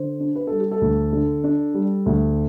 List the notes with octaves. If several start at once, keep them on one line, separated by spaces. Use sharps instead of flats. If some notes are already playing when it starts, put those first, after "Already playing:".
Already playing: D3 C5
D4
B4
G3 A4
G4
A4
D2
D3
D4
G3
D2